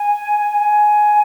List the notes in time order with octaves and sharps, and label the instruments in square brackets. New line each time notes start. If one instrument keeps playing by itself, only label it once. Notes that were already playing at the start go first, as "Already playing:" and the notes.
Already playing: [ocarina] G#5
G#5